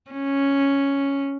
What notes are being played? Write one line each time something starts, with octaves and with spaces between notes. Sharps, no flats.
C#4